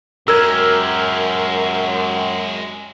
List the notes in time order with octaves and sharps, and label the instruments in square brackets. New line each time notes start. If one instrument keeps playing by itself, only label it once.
[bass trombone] F#2 [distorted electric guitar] G#3 G4 [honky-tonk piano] A#4 [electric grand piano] E6 G#6